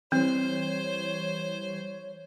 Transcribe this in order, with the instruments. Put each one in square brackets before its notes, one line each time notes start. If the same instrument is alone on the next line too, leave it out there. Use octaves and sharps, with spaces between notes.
[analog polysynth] E3 G3 [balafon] C4 [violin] C5 [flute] C#5